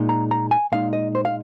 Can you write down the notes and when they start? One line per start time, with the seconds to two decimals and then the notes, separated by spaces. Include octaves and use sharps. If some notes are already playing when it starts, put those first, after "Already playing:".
Already playing: A#2 G#3 D#4
0.09 A#5
0.31 A#5
0.51 G#5
0.72 A#2 G#3 D#4 F5
0.93 D#5
1.15 C5
1.25 F5